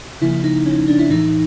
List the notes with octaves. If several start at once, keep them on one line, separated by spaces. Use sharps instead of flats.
C#3 F3 A#3 E4
D#4
C#4
D4
E4
A2 E3 A3 D#4